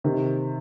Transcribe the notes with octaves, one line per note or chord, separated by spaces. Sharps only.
C3 D#3